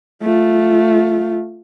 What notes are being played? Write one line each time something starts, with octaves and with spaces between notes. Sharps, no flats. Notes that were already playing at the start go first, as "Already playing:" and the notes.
A3 F4